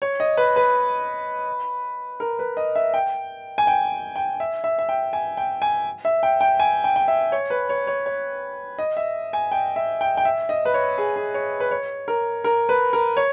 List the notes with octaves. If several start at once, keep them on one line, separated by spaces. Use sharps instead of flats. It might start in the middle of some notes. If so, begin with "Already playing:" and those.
C#5
D#5
B4
B4
A#4
B4
D#5
E5
G5
G#5
G5
G5
E5
E5
E5
G5
G#5
G5
G#5
E5
G5
G5
G#5
G5
G5
E5
C#5
B4
C#5
C#5
C#5
D#5
E5
G#5
G5
E5
G5
G5
E5
D#5
B4
C#5
G#4
G#4
C#5
B4
C#5
A#4
A#4
B4
A#4
C#5